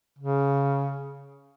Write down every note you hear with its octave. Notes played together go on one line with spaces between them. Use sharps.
C#3